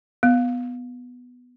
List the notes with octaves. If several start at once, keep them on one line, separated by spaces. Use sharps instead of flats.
B3